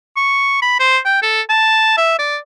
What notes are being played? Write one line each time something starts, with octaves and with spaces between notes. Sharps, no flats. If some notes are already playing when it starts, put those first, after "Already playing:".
C#6
B5
C5
G5
A4
A5
E5
D5